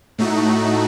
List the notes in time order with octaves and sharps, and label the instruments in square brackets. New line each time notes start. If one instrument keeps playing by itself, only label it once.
[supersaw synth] A2 A3 D#4 F#4